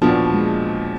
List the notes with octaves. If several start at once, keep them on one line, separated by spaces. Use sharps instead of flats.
D#2 A#2 F3 B3 D4 F#4
G#3